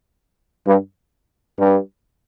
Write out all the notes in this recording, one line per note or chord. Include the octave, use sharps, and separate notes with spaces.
G2
G2